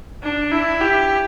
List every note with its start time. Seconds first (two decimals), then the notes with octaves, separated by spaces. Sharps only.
0.23 D4
0.52 E4
0.81 G4